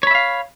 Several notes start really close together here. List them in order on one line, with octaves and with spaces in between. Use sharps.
C#5 B5 E5 F5